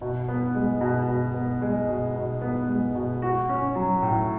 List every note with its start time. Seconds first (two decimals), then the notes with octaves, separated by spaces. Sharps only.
0.01 B2
0.29 B3
0.55 G#3
0.81 B2
1.08 B2
1.34 B3
1.62 G#3
1.89 B2
2.16 B2
2.41 B3
2.68 G#3
2.95 B2
3.22 F#4
3.49 C#4
3.75 F#3
4.02 A2